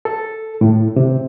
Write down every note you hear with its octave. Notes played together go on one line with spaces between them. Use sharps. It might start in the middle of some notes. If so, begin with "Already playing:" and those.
A4
A2
C3